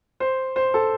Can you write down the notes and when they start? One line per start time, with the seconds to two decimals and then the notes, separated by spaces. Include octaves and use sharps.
0.20 C5
0.56 C5
0.74 A4